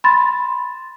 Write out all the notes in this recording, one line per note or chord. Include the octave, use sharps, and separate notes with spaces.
B5 C6 A6